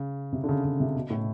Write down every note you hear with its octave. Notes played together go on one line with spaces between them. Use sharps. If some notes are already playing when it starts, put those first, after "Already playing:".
Already playing: C#3
C3
D3
C#3
C#3
C3
B2
A2